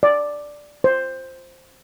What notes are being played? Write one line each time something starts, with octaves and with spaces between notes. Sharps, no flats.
D5
C5